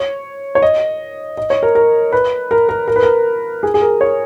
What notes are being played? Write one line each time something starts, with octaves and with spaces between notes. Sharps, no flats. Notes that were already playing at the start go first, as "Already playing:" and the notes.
Already playing: C#5
C#5
D#5
D#5
C#5
A#4
A#4
B4
A#4
A#4
A#4
B4
A#4
G#4
G#4
A#4
C#5